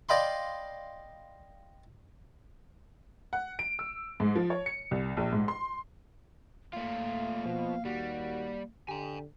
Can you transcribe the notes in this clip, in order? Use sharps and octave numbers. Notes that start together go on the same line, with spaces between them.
D5 D#5 F5 G5 B5 C6
F#5
D7
E6
G#2
F3
C#5
C#7
C2
A#1
G#2
C6
A3 A#3 F4 F5
B2 F3
D#2 G3 F#4
D3 G4 G#5 A#5